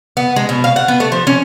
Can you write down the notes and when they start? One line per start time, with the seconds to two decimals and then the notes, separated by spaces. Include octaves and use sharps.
0.17 B3
0.36 G#3
0.49 B2
0.64 F5
0.76 F#5
0.88 B3
1.00 A3
1.12 F3
1.27 C#4